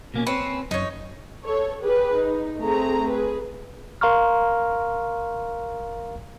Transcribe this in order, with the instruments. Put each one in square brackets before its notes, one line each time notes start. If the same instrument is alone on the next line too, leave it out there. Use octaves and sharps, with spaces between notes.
[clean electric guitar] B2 A#3 C#4
[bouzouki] C4 C#4 [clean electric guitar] B4
[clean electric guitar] F#2 [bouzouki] D#4 C#5
[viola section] A4 C#5
G4 G#4 B4
D#4
A3 C4 G#4 A#5
G#4 B4
[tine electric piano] A#4 F5 A#5 C6 C#6 F6